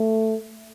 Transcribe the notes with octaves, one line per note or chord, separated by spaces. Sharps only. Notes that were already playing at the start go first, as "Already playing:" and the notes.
Already playing: A3